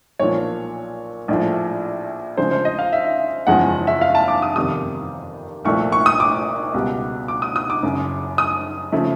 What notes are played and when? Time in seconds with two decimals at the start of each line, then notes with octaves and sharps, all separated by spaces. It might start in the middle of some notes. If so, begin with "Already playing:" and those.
0.19 B1 A#2 F3 C#5
1.28 A#1 A2 F3
2.37 D2 C#3 F3 G#3 C5
2.51 C5
2.65 D#5
2.79 F5
2.93 E5
3.47 F#1 E2 C#3 F3 G#3 F#5
3.87 E5
4.01 F5
4.15 A5
4.28 D6
4.42 D#6
4.55 G1 F2 C3 D#3 G3 D#6
5.65 C2 A#2 F3 A3 C#6
5.92 C#6
6.06 D#6
6.20 D6
6.74 C#2 B2 G3
7.28 D6
7.42 D#6
7.56 D#6
7.70 D6
7.83 F#1 F#2 C#3
8.38 D#6
8.92 C#3 F3 A3